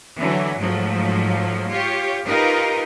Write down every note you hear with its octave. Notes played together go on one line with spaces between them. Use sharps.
D3 E3 F#3
G#2 F3 F#3 A3
F4 G4 C#5
D#4 F4 G4 A#4 B4